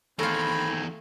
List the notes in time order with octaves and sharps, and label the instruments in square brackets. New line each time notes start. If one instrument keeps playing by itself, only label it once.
[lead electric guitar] E2 D#3 [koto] A3 F4 [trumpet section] C4 G#5 A#5 [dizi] B5